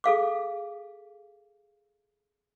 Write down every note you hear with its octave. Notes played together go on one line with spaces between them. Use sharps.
G#4 A4 F5 D6